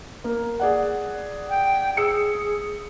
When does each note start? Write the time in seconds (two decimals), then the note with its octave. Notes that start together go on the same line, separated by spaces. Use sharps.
0.24 A#3
0.60 G#4 D5 F#5
1.49 G5
1.97 G#4 E6 C#7